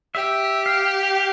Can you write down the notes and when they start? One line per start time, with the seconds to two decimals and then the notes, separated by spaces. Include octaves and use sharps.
0.14 G4 E5
0.66 F5